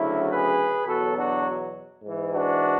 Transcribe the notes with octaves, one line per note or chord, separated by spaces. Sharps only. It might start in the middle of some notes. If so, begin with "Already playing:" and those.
Already playing: D2 C#3 F#3 E4
G#4 B4
E2 B2 F#3 F#4 A4
D4 F#4
G#2 E3
D4 F#4